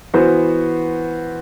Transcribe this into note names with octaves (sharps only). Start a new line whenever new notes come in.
E3 B3 F#4 C5